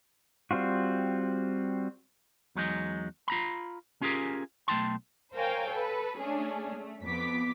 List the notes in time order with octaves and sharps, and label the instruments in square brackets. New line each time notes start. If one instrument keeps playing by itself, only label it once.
[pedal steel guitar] G3 C4 F4 F#4
[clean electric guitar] E2 F#3 G#3 D#4
F4 A#5 B5
C#4 F4 G4 G#4 A#4
B1 A3 G5 A5 C6
[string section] A#4 C5 C#5 F5 G5 G#5
A4 B4
A3 C#4 D4 G#4
A3
F2 B3 D6 B6